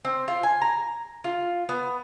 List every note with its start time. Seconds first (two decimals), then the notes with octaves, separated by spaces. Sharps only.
0.05 C4
0.28 F4
0.43 G#5
0.62 A#5
1.24 F4
1.69 B3